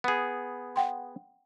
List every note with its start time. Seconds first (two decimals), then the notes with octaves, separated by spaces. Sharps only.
0.04 B3 G#4
0.76 F#5 G5 C6